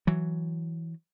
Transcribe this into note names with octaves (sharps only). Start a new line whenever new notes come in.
E3 F#3